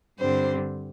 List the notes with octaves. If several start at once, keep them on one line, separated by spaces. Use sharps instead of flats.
G2 D3 G3 C4 C5